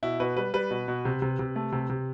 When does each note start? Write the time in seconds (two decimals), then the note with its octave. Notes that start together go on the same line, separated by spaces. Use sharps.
0.03 B2 E4
0.20 B2 B4
0.36 G3 B4
0.54 G3 B4
0.71 B2
0.88 B2
1.05 C3
1.22 C3
1.39 C3
1.56 A3
1.72 C3
1.90 C3